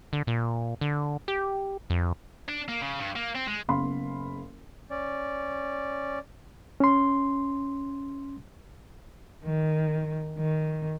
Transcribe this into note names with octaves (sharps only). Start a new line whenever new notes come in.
D3
A#2
D3
G4
F2
D4
A#3
C#3
G2
A#3
C4
G#3
F#1 F#2 B3 F5 B5 C6
C#4 D5
C#4 C6
D#3
D#3